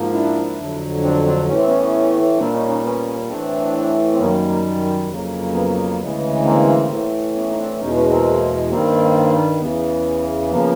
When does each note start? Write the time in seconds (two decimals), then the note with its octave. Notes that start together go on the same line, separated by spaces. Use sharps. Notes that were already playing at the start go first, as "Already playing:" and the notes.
Already playing: G#2 F3 A#3
0.13 D4 E4
0.58 F2 D3 F#3
1.03 C4 D4
1.25 C4 D4
1.48 A2 E3 A3 C#4
1.57 C4
1.67 B3 C#4
2.38 A#2 G3 A#3 C4 D4
2.53 C#4 D#4
2.68 C#4 D#4
2.83 B3 C#4
3.29 A2 E3 A3 C4 D4
4.13 C4
4.19 F#2 D#3 G3 A#3 B3 C#4
4.49 A#3
5.09 F2 C#3 F#3 A#3
5.54 B3
5.99 D2 C#3 E3 G#3
6.44 A#3 C4
6.90 A2 E3 A3
7.35 B3 C#4
7.50 D#4
7.57 C4 D4
7.80 E2 B2 G#3 C#4 D#4
7.95 B3 C#4
8.10 A#3 C4
8.70 G2 D#3 G3 A#3 C4
9.61 E2 C#3 E3 B3
10.51 C#3 F3 A#3 B3